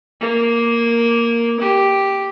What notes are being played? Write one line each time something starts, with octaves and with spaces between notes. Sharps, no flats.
A#3
G4